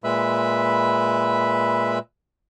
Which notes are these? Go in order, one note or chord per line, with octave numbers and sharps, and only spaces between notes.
A#2 G#3 B4 E5 B5